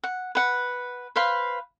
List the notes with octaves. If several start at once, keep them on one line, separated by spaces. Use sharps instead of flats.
F#5
B4 F#5
B4 C5 F5 B5